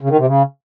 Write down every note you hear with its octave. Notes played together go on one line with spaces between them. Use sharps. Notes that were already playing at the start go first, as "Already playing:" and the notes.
C#3
D#3
C3
C#3